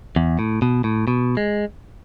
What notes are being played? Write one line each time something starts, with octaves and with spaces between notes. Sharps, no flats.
E2
A2
B2
A2
B2
G#3